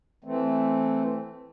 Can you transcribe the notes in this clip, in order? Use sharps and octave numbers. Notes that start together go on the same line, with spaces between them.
E3 A3 C4